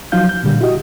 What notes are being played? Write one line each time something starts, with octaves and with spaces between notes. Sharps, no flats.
F3 F#3 D#4 F5 G6
G6
A#2 D3 G3
E4 F#4 G4 D#5